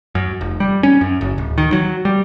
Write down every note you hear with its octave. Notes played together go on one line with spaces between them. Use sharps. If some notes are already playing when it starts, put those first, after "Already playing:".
F#2
F1
G3
C#4
F#2
F#1
D1
D#3
F#3
G3